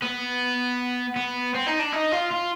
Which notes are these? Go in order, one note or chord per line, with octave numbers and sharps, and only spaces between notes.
B3
B3
C4
D#4
D4
D#4
F4
F4